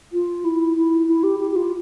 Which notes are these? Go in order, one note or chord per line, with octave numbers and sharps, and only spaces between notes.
F4
E4
E4
E4
G4
G4
G4
F4